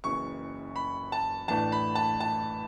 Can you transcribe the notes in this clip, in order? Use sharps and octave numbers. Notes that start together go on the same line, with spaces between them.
F#1 F#2 C#3 E3 C#6
B5
A5
A1 A2 E3 A3 D4 A5
B5
A5
A5